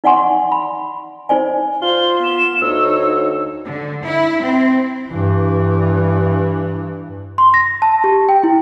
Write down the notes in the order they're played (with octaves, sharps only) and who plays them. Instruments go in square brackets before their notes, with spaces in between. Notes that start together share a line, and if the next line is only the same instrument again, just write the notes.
[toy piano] D#4 D5 F#5 G#5 C6 C#6
B5
D#4 C5 D5 G#5
[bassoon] F4 [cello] C5 [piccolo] G7
[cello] B3 [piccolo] E7
[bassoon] D2 [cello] D#4 C#5 [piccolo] E6
[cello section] D3
E4
C4
[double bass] G2 E3
[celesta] C6
A#6
A5
G4
G5
E4